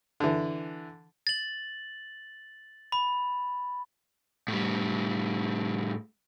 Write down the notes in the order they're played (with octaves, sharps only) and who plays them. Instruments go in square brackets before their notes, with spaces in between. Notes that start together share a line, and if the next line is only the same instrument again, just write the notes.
[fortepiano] D3 E3
[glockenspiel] A6 F#7
B5
[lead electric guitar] A2 G3